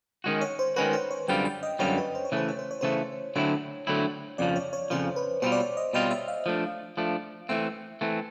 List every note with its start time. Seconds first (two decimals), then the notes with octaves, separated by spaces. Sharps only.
0.24 D#3 G#3 C#4 F#4
0.41 C#5
0.59 C5
0.76 D#3 G#3 C#4 F#4 B4
0.93 C5
1.11 C#5
1.28 F#2 D3 G3 C4 F4 G5
1.45 G5
1.63 D#5
1.79 F#2 D3 G3 C4 F4 C#5
1.98 B4
2.15 C5
2.25 C#5
2.32 C#3 E3 A3 C5
2.48 C#5
2.59 C5
2.71 C#5
2.81 C#3 E3 A3 C5
3.36 D3 F#3 A3 C4 E4 C#5
3.87 D3 F#3 A3 C4 E4
4.38 F2 C#3 F3 D5
4.56 C#5
4.73 C#5
4.90 F2 C#3 F3 C5
5.16 B4
5.42 B2 G3 C4 F4 C5
5.52 D5
5.60 C#5
5.77 D#5
5.93 B2 G3 C4 F4 D#5
6.11 E5
6.28 F5
6.46 F3 A3 D4
6.97 F3 A3 D4
7.49 E3 A3 C4 E5
8.01 E3 A3 C4